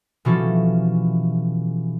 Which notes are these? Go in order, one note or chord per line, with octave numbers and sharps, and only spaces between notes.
B2 E3 F3 G3 C#4 A4